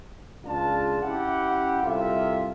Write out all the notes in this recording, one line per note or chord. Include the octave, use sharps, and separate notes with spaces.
C#2 D4 F4 G#4 A5
C#4 E4 G4 F#5
C2 C3 F4 A4 E5